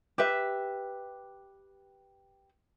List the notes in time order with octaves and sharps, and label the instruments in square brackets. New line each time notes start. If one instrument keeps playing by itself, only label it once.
[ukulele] G4 B4 E5